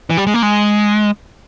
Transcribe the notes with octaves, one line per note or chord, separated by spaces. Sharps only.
E3
G3
G#3
A#3
G#3